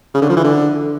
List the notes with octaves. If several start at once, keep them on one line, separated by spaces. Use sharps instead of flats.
C#3
D3
F3
E3
D3